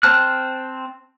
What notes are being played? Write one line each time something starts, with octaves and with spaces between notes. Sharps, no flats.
C4 C5 A5 F6 F#6